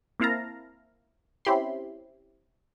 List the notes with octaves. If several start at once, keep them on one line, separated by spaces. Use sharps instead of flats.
A#3 C4 E4 F5 A5 A#5
C4 C#4 E4 G4 B5 C6